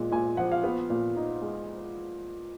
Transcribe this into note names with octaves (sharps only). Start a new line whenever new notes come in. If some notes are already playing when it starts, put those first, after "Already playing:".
Already playing: A#2 G#3
A#2 G#5
F3 F#5
F5
B3
A#2
D#4
G#3